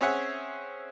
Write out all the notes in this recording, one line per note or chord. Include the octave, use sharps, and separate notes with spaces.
C4 C#4 G#4 C#5 E5 F#5